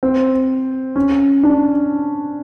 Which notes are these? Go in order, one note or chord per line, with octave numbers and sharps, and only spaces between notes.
C4
C#4
D4